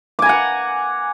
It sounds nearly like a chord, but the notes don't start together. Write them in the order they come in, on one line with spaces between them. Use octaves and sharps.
D6 G#5 A#5 F#5